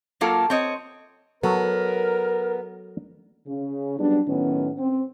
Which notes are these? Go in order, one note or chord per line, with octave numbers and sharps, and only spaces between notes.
F#3 A#3 F4 A4
C4 C#5 D#5
F#3 B3 A4 A#4
C#3
F#3 G3 B3 D4
A2 D#3 F#3 B3 C#4
C4